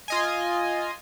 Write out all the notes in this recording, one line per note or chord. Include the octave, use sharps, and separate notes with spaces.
F4 D#5 G#5